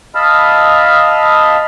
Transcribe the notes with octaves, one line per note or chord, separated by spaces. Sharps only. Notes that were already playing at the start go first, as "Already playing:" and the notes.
D#5 F5 A5 B5 E6 F6